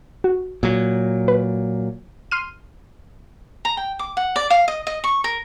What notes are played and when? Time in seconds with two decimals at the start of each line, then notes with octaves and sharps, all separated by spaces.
0.24 F#4
0.63 A#2 F#3
1.28 B4
2.31 C6 F6 D#7
3.65 A#5
3.77 G5
3.99 D6
4.17 F#5
4.36 D5
4.50 F5
4.68 D#5
4.87 D#5
5.04 C#6
5.24 A#4